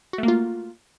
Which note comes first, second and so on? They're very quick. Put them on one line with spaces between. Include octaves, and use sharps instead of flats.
F#4 A3 A#3 F4